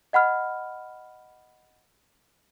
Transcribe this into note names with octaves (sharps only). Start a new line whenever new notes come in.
D#5 F#5 B5 F6